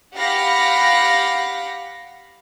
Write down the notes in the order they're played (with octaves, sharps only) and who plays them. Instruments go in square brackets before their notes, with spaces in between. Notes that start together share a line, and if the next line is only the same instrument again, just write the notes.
[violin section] G4 F5 F#5 B5 A#6